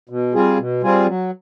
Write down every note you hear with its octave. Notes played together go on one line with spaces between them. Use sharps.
B2
G3 C4 F4 G#4
B2
G3 C4 F4 G#4
F#3